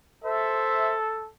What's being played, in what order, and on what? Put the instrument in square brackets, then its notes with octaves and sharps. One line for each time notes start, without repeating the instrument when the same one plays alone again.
[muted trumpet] A4 [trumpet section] C5 E5